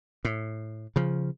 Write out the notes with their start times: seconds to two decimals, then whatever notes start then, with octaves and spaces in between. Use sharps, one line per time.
0.25 A2
0.96 C#3 F3